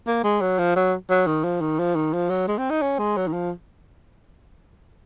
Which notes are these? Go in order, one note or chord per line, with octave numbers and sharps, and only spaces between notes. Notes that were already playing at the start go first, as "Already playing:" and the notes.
A#3
G#3
F#3
F3
F#3
F#3
D#3
F3
D#3
F3
D#3
F3
F#3
G#3
C4
D#4
C#4
G#3
F#3
D#3
F3